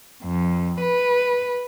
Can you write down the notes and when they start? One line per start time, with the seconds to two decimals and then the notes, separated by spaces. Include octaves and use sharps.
0.24 F2
0.81 B4